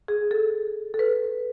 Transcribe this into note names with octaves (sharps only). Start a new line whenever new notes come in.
G#4
A4
A4
B4